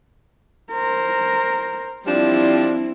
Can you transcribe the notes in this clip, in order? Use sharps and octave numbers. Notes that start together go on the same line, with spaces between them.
A#4 C5
F3 G3 C4 D4 E4